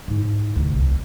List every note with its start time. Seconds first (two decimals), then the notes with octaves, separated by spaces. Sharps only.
0.08 G#2 E4
0.56 D2 C3
0.75 C2